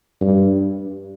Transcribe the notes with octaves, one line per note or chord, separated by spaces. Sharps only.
G2